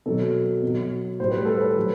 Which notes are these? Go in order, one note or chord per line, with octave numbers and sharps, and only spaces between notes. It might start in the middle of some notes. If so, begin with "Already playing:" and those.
B2 F#3 A4
B2 F#3
A2 G3 C5
B4
A4
B4
F#3